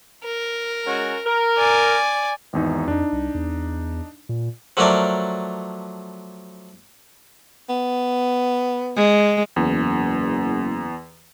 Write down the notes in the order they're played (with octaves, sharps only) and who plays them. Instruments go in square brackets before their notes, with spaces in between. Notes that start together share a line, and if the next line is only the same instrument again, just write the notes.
[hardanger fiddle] A#4
[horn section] G#3 C#4 F#4
A#4
[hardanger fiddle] D5 G#5
[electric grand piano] G#1 E2 D#4
[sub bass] F2 [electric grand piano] D4 D#4
[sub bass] C2
E2
A#2
[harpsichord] F3 F#3 A3 D4 A#4 D5
[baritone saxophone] B3
[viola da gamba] G#3
[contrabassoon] F#1 [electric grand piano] E2